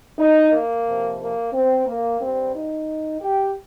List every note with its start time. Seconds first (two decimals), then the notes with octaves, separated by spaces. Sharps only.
0.18 D#4
0.51 A#3
0.86 F2 C3 F3
1.20 A#3
1.53 C4
1.86 A#3
2.20 G2 G3 C4
2.54 D#4
3.20 G4